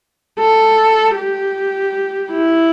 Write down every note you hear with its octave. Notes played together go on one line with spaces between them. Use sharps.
A4
G4
E4